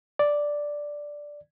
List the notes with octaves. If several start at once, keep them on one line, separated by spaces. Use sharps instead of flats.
D5